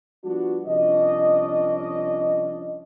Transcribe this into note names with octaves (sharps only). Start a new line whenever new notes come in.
F3 G3 B3 D4 F#4
C2 F3 C#4 D4 D#5